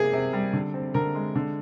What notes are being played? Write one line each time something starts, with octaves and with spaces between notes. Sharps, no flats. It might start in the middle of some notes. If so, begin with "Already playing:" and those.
Already playing: C3 A#3 G#4
C3
G3
D3
C4
D3 A#4
G#3
D3